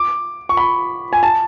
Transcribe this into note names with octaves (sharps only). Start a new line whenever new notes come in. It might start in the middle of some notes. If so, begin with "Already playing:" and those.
Already playing: D6
C#6
B5
G#5
A5